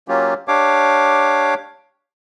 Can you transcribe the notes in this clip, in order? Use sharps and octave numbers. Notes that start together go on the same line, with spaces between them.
F#3 A#3 C#4 F4 G4
D4 G4 C#5 F5 D6